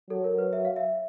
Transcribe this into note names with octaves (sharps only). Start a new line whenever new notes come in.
F#3 A4
A#4
B4
E5
F5
E5